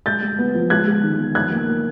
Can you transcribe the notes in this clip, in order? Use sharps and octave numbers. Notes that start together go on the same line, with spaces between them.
G#3 G6 A6
G#3
B3
F3
G#3 F#6 G#6
G#3
D#3
B3
F3 F#6 G#6
A#3
A#3